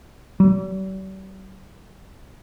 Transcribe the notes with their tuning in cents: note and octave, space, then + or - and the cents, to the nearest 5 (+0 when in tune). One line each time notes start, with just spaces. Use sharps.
G3 -45